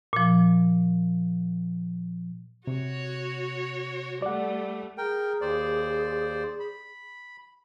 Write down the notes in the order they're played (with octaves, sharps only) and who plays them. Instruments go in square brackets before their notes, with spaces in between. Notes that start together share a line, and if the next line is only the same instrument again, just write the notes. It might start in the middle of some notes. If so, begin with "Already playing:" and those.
[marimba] A#2 F3
[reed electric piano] C3 [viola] F#4 C#5
[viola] G3 A3 [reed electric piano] D5 F#5
[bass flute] G#4 [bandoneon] A#4 G5
[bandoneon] D#2 C5 D5
B5